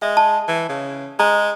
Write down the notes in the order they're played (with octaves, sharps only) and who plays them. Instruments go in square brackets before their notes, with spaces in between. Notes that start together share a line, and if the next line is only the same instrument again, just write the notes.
[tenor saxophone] G#3 [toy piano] E5
[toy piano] A5
[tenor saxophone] E3
C#3
[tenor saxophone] G#3 [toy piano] A#5